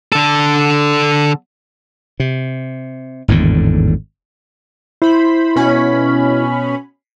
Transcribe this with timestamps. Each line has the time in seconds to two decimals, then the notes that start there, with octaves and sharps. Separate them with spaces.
0.12 D3 A4
2.20 C3
3.28 G#1 E2 A2 D3
5.02 E4 C5 B5
5.56 B2 C#4 B5